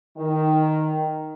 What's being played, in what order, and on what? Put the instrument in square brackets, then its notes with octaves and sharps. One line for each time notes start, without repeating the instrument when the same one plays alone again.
[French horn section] D#3